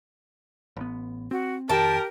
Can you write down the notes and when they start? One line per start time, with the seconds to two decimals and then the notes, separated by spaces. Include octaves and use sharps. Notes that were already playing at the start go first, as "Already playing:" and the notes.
0.77 A1 B3
1.31 C4 F#4
1.69 F2 D#3 G4 A#4 G5 A5